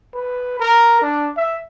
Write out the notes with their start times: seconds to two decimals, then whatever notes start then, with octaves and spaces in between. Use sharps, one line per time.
0.14 B4
0.59 A#4
1.02 D4
1.37 E5